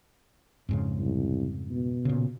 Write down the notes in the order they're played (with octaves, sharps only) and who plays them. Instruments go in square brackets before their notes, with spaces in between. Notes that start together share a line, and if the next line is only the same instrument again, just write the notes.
[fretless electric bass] F2 G#2 C#3
[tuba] C2
B2
[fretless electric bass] A#2 C#3